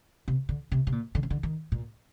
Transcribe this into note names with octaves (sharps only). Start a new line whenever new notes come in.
C3
D3
C3
C3
A#2
D3
C3
D3
D#3
A#2